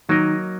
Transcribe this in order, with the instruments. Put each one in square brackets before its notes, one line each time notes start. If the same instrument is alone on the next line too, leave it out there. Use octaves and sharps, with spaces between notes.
[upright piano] D#3 [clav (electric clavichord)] F#3 A#3 D#4 A#4 D#5